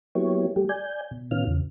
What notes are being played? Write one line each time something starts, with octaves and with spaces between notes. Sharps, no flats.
F#3 A#3 B3 E4 G4 C#5
G3 A3 G4
D5 G#5 G6
B2
A2 D#3 B3 C#4 F4 F6
E2 C#3